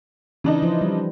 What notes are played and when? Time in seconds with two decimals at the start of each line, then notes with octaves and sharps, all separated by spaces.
0.44 C#3 E3 D4 D#4
0.62 F3 E4 C5
0.81 G3